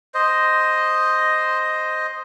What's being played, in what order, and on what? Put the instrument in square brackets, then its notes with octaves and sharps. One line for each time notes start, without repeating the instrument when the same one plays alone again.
[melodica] C5 D#5